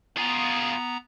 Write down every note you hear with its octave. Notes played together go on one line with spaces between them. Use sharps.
B3 F4 G#4 A#5